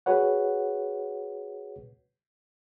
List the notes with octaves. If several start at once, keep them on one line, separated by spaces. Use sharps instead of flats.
F#4 G#4 B4 C#5 F#5